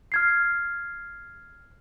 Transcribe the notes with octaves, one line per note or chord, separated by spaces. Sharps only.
F6 G#6 C7